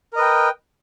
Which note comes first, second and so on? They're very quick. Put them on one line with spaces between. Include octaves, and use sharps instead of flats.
A#4 D#5 B4 G5